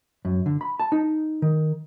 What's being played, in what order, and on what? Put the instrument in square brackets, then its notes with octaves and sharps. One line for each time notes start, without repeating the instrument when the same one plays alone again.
[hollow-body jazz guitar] F#2
D3
B5
A5
D#4
D#3